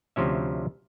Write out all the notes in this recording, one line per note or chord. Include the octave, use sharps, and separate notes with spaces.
D2 C3 F3 C#4 E5